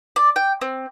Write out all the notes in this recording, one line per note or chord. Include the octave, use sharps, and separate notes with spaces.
D5
G5
C4